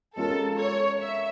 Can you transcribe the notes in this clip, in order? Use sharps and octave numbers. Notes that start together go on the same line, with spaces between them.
G#3 C#4 F4 A4 A#4
C#5
E5